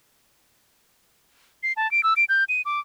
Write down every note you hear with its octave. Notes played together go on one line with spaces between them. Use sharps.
C7
A5
D7
E6
D7
G6
D#7
D6